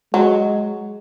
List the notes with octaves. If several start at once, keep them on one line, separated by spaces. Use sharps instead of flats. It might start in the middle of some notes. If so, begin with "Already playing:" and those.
F#3 G#3